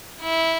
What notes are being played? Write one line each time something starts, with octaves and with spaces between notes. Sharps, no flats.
E4